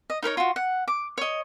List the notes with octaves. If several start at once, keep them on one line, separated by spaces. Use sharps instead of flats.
D#5
D#4 A#4 B4 C#5
F4 F#4
F#5
D6
C#5 D#5